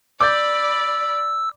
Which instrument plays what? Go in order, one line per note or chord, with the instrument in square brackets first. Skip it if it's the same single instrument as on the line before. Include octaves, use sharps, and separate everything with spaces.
[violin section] D5 B5 [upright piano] D6 G6 A6 [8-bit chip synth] E6